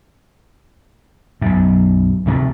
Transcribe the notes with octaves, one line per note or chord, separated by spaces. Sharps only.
B1 F#2
D2 C3 G3 A3